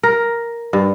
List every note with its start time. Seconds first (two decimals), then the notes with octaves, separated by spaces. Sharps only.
0.03 A#4
0.73 G2